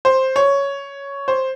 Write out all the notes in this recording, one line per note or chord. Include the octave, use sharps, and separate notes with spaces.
C5
C#5
C5